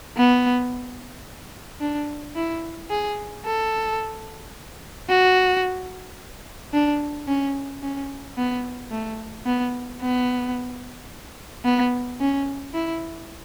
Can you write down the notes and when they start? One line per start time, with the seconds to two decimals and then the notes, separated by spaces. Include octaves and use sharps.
0.17 B3
1.80 D4
2.36 E4
2.90 G#4
3.45 A4
5.09 F#4
6.73 D4
7.28 C#4
7.82 C#4
8.37 B3
8.91 A3
9.46 B3
10.01 B3
11.65 B3
12.20 C#4
12.74 E4